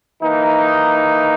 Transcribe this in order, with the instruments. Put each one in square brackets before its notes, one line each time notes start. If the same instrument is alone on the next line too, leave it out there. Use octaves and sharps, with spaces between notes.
[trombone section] E3 A#3 D#4